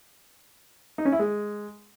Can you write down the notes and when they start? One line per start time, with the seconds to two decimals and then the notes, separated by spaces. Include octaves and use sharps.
0.98 D#4
1.05 C#4
1.12 E4
1.19 G#3